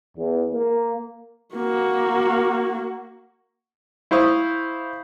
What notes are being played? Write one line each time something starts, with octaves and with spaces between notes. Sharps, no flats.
E2
A#3
A#3 F#4
E4 C5 F5 C#6 D#6